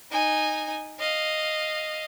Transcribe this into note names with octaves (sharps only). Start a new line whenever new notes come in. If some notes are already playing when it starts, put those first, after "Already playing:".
D#4 G#5
D#5 F5